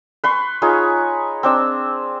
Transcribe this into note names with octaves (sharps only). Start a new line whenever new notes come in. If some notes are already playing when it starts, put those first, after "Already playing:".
B4 C6 C#6
D#4 F4 G#4 C#5
C4 D4 E6